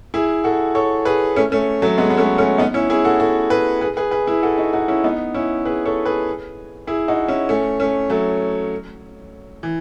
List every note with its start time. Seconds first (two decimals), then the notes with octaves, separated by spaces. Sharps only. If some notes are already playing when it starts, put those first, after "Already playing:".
0.14 E4 G#4
0.44 F#4 A4
0.75 A4 C#5
1.05 G#4 B4
1.36 A3 C#4
1.52 A3 C#4
1.82 F#3 A3
1.98 G#3 B3
2.10 B3
2.17 A3 C#4
2.38 A3 C#4
2.58 B3 D#4
2.74 C#4 E4
2.90 E4 G#4
3.05 F#4 A4
3.20 F#4 A4
3.50 G#4 B4
3.81 G#4 B4
3.97 G#4 B4
4.11 G#4 B4
4.27 E4 G#4
4.42 F#4 A4
4.58 D#4 F#4
4.73 D#4 F#4
4.88 C#4 E4
5.04 B3 D#4
5.34 C#4 E4
5.65 G#4 B4
5.85 A4 C#5
6.05 G#4 B4
6.87 E4 G#4
7.08 D#4 F#4
7.28 C#4 E4
7.49 A3 C#4
7.80 A3 C#4
8.10 F#3 A3
9.63 E3